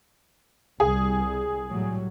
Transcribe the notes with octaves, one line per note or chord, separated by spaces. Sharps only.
C2 G3 G#4
A2 F#3 G3